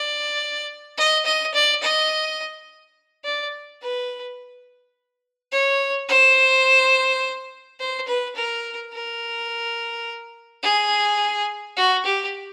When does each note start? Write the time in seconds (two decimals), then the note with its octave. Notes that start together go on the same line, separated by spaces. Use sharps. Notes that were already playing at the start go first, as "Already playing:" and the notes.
Already playing: D5
0.98 D#5
1.25 D#5
1.54 D5
1.82 D#5
3.24 D5
3.82 B4
5.52 C#5
6.08 C5
7.80 C5
8.08 B4
8.36 A#4
8.93 A#4
10.63 G#4
11.77 F#4
12.05 G4